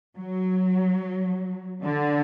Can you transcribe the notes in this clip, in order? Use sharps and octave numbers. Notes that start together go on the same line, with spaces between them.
F#3
D3